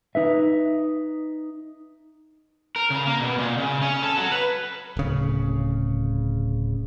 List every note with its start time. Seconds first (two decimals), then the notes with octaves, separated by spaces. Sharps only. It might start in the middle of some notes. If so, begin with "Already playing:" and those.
0.15 D#4 B4 E5
2.76 A#4
2.90 C#3
3.06 A#3
3.20 B2
3.38 A#2
3.58 C#3
3.82 C#4
4.02 A4
4.17 F#3
4.32 B4
4.97 D1 C#3